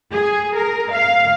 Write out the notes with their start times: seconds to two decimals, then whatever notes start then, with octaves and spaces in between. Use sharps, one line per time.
0.13 G#4
0.56 A#4
0.93 F5